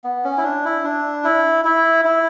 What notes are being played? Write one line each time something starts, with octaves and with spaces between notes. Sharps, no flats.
B3
C#4
E4
D4
E4
D4
E4
E4
E4